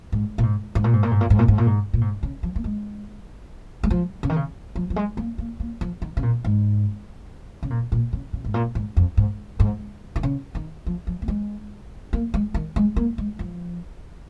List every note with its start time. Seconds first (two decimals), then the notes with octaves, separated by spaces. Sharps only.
0.12 G#2
0.38 A#2
0.43 G#2
0.75 G#2
0.84 A#2
0.93 G#2
1.03 A#2
1.11 G#2
1.21 A#2
1.30 G#2
1.39 A#2
1.48 G#2
1.58 A#2
1.67 G#2
1.93 A#2
2.01 G#2
2.23 C#3
2.43 F3
2.56 A#3
2.64 G#3
3.83 G#3
3.90 F3
4.23 C#3
4.29 D#3
4.36 C#3
4.76 F3
4.90 F3
4.96 G#3
5.17 A#3
5.38 A#3
5.60 A#3
5.81 F3
6.02 D#3
6.17 C#3
6.23 A#2
6.44 G#2
7.63 C#3
7.70 A#2
7.92 A#2
8.13 C#3
8.33 C#3
8.45 G#2
8.54 A#2
8.75 G#2
8.97 F2
9.17 G#2
9.60 G#2
10.16 D#3
10.23 C#3
10.55 D#3
10.86 F3
11.07 F3
11.22 A#3
11.28 G#3
12.13 A#3
12.34 G#3
12.54 D#3
12.76 G#3
12.96 A#3
13.18 G#3
13.39 F3